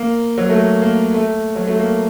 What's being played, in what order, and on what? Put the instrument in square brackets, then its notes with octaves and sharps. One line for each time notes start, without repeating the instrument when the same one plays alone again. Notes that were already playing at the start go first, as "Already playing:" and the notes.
Already playing: [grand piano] A#3
F#3
A3
A#3
A3
F#3
A3
A#3